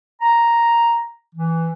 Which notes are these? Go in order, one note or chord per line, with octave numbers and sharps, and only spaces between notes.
A#5
E3